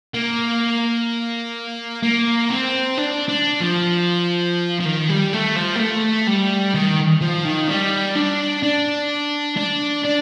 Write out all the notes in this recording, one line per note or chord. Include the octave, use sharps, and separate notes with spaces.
A#3
A#3
C4
D4
D4
F3
F3
D#3
G3
A3
F3
A#3
A3
G3
D#3
F3
D#3
G3
D4
D4
D4
D4